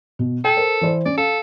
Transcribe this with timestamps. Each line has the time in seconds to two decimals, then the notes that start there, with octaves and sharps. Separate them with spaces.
0.19 B2
0.45 A4 G5
0.57 A#4 C5
0.81 E3 C5 D5
1.06 C#4 D5
1.18 A4 F5